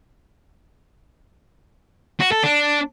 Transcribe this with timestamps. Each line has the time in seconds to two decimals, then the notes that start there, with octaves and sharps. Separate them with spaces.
2.20 F#4
2.32 A4
2.43 D4